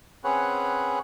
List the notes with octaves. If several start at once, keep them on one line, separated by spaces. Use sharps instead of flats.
C4 C#4 G#4 B4 C#5 F#5